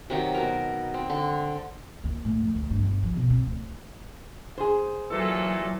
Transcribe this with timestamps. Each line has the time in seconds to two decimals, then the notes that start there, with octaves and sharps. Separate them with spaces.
0.10 C3 D#3 F#3
0.34 B2 A#4
0.94 C4
1.10 D3
2.04 D#2
2.25 A2
2.40 F2
2.55 D2
2.70 G2
2.83 G1
3.03 F3
3.16 B2
3.30 C4
3.47 D1
4.58 G#4 C5
5.10 A#2 E3 F#3 A4